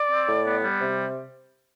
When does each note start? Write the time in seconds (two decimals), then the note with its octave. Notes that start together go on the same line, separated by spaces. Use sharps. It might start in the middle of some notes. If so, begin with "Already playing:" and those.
Already playing: D5
0.11 C4
0.28 A2
0.45 B3
0.63 G3
0.80 C3